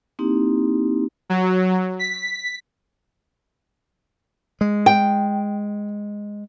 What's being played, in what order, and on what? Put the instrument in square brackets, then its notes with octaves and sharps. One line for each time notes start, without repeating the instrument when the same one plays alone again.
[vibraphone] A#3 C4 D#4 E4 G4
[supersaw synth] F#3
B6
[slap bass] G#3
[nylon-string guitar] G5